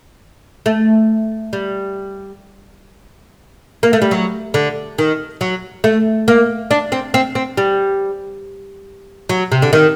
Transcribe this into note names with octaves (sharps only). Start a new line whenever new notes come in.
A3
G3
A#3
A3
G3
F#3
D3
D#3
F#3
A3
A#3
D4
C4
C4
C4
G3
F#3
C3
D3
D#3